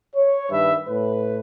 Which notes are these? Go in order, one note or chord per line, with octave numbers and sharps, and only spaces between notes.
C#5
G2 D#3 B4 E5
A2 B4